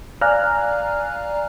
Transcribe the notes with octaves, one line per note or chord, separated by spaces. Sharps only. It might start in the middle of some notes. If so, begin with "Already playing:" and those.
D5 F5 G#5 A#5 F6 F#6